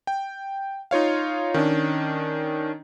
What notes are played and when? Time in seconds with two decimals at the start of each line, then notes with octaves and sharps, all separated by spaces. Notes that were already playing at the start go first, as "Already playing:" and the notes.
0.07 G5
0.91 D#4 F4 C#5 F5
1.54 D#3 C#4 D4